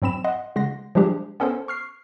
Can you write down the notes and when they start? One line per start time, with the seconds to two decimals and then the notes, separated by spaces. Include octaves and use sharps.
0.02 G#2 F#3 C4 B5 E7
0.24 D#5 F#5 C6
0.56 C#3 G#3 F#5 C6 A#6
0.95 F3 G3 G#3 D4 G4 G#4
1.40 B3 C#4 A4 A#4 C5
1.68 C#6 F6 C7